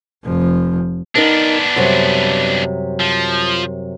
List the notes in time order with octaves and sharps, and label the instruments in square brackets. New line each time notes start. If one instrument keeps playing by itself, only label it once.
[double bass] F1 F3
[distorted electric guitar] B3 D4 [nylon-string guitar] D#4 A#4 D#5
[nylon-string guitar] F#2 C3 G3
[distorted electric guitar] F3